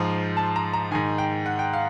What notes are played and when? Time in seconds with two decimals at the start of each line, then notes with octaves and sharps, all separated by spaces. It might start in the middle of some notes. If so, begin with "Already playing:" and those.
Already playing: G#2 F3
0.37 A5
0.56 A#5
0.73 A#5
0.91 G#2 D#3 G#5
1.18 G5
1.46 F#5
1.59 G5
1.73 F5